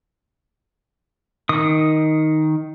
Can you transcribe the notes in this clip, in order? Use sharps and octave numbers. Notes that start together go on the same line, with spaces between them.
D#3 D#6